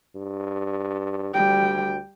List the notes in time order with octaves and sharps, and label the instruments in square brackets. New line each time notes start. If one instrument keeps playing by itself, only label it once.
[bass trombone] G2
[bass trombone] D2 [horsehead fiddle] G3 G5